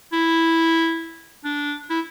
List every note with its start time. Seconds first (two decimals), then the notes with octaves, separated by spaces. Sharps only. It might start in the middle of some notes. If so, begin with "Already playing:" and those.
0.13 E4
1.45 D4
1.90 E4